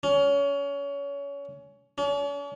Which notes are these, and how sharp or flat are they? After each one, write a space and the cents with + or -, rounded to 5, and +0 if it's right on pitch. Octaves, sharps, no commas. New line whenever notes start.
C#4 +25
C#4 +45